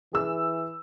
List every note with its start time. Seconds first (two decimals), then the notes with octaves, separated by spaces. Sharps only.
0.13 E3 G#4 E6